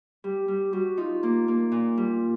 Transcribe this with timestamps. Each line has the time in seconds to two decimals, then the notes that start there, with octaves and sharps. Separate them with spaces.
0.24 G3 G4
0.48 G3 G4
0.73 G3 F#4
0.97 D#4 F4
1.23 A#3
1.48 A#3
1.72 A#2
1.97 G3